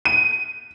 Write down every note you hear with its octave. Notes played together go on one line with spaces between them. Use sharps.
D#7